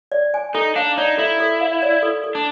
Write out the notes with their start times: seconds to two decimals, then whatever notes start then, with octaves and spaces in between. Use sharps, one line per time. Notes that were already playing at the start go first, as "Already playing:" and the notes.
0.12 D5
0.34 G#5
0.54 D#4 A4
0.76 D4 F5
0.98 D#4 D5
1.18 E4 A4
1.40 A4
1.61 F5
1.82 D5
2.02 A4
2.24 A4
2.35 D4